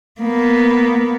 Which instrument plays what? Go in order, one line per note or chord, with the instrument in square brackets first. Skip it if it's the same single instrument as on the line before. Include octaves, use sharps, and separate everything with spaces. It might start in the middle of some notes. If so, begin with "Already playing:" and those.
[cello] A#3 B3